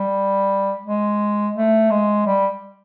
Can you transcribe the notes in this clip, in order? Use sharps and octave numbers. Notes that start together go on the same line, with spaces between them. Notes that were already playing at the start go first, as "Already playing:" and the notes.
Already playing: G3
G#3
A3
G#3
G3